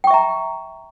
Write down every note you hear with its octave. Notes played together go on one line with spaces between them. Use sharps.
E5 G5 A#5 C#6